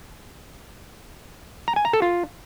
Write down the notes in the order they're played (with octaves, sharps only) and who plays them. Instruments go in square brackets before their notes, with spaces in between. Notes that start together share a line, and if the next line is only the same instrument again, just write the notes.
[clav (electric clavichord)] A#5
G#5
A#5
A4
F4